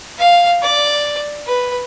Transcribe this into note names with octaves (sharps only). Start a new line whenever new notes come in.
F5
D5
B4